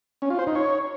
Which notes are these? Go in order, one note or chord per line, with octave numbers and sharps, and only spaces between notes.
C#4
F4
C5
D#4
C#5